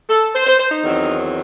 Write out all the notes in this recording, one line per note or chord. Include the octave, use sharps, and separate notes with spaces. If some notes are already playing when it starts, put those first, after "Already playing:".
A4
C5
C5
C5
D#4
E2 D#3 F#3 C4